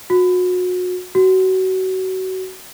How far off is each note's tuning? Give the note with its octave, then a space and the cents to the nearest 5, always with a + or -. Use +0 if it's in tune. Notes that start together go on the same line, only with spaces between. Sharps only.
F#4 -35
F#4 +25